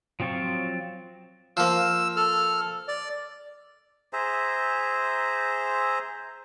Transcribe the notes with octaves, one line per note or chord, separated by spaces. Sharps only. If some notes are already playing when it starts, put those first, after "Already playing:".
F3 F#3 C4 F4 C#6
F3 A#3 E6
A4 F6
D5
G#4 C5 E5 A#5